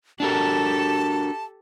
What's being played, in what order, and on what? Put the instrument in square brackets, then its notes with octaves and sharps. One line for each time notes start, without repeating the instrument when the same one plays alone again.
[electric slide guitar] D4 F#4 A#4 [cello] G4 A4 [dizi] A5